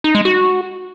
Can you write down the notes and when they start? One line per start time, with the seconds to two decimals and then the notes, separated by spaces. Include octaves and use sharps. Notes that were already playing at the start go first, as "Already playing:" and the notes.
0.04 D#4
0.15 G#3
0.25 F#4